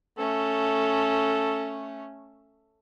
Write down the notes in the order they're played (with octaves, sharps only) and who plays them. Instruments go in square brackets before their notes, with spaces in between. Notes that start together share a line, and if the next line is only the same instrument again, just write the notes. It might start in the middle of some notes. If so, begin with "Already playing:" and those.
[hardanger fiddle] A3 C#4 [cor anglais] A4